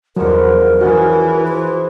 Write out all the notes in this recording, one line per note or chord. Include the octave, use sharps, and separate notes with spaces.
E2 D3 D#3 F3 F#3 A#4
E3 C#4 F#4 G#4
B4 C5